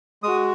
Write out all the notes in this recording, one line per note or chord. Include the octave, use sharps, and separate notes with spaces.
G#3 F#4 D#6